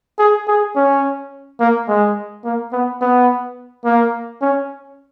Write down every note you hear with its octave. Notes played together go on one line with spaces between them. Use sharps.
G#4
G#4
C#4
A#3
G#3
A#3
B3
B3
A#3
C#4